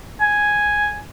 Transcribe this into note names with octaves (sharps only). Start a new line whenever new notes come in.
G#5